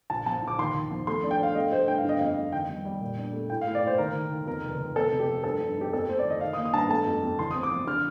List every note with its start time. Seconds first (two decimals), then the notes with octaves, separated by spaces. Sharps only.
0.10 A#1 A5
0.26 F3 A5
0.42 A#1
0.48 D6
0.58 D#2 C6
0.75 D#2
0.91 F3
1.07 A3 C6
1.24 D4
1.31 G5
1.40 D4 F5
1.55 A3 D#5
1.72 A3 C5
1.88 G2 G5
1.98 F5
2.05 D3 D#5
2.19 F2 F5
2.37 F2
2.52 D#3 G5
2.69 G3
2.85 G3
3.01 A#2
3.18 D4
3.33 A3
3.50 A2 G5
3.61 F5
3.67 A2
3.75 D5
3.83 A2 C5
3.98 D#2 A#4
4.15 D#2
4.31 D#2
4.46 F2 A#4
4.64 F1
4.79 F1
4.96 F2 A4
5.12 C3
5.19 G4
5.28 F3
5.44 G2 A4
5.61 G2
5.77 D#4 G4
5.93 F2 A4
6.09 A3 C5
6.19 D5
6.25 D#3
6.30 D#5
6.41 D#3 F5
6.53 D#6
6.57 A#3
6.65 D#6
6.73 G2 A5
6.78 A#5
6.89 A3 A5
7.06 F2
7.22 F2
7.39 A1 C6
7.51 C4 D#6
7.63 D6
7.71 F3
7.87 D3 F6